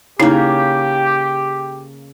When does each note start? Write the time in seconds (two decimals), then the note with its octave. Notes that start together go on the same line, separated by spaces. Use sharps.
0.20 C#3 A#3 D#4 E4 G4